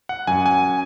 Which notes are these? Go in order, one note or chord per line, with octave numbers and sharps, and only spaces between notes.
F#5
F#2 G#5
G#5